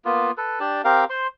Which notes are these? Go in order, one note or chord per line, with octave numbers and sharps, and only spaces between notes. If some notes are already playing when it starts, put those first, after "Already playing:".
A#3 B3 F4
A4 B4
D4 G4 D5 A5
C4 G4 A#4 F5
C5 C6